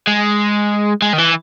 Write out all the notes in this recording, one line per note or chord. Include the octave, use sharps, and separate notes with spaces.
G#3
G#3
D#3
E3